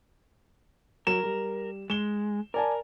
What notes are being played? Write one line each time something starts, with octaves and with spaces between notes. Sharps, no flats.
F#3 A#4 E7
G3
G#3 E7 G7
A#4 D5 G#5 A5